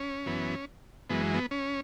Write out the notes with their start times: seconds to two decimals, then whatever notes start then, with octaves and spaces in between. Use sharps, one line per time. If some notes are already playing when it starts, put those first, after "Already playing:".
Already playing: C#4
0.26 F#2 E3 B3
1.10 F#2 E3 G#3 B3
1.34 B3
1.51 C#4